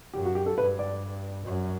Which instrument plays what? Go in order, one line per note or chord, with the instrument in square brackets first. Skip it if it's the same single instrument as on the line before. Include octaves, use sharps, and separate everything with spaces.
[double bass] F#2 [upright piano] G4
[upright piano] F#4
G4
A4
[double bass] G2 [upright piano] B4
[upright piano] D5
[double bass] F#2